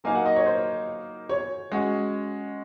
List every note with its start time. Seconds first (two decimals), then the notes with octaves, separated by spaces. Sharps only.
0.04 F#3 A#3 D#4 A#4 F5 G#5
0.15 F#5
0.26 D#5
0.36 C#5
0.46 C5
1.29 C#5
1.72 G#3 C#4 F#4